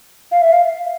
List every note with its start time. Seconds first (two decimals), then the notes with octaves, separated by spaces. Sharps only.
0.32 F5
0.42 E5
0.52 F5